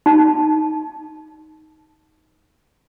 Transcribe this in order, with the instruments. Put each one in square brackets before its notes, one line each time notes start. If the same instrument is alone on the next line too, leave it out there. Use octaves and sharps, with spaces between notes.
[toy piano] D#4 A5